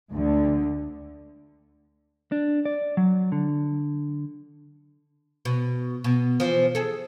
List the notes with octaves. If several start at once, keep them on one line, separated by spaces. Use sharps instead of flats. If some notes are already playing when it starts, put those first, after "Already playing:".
D2 D3
D4
D5
F#3
D3
B2
B2
E3 F3
G#4 A4